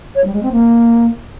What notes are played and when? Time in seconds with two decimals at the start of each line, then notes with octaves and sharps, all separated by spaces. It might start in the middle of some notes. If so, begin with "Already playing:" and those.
0.15 C#5
0.24 G3
0.34 G#3
0.43 C4
0.52 A#3